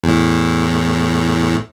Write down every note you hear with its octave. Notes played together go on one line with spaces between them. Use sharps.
E2 A2